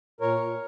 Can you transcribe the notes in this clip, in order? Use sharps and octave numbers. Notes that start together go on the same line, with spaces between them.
A#2 A#4 C#5
A#2